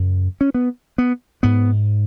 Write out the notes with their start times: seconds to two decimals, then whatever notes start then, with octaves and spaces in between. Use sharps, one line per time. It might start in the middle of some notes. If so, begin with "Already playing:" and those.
Already playing: F#2 C#3
0.41 C#4
0.54 B3
0.98 B3
1.43 G#2 B3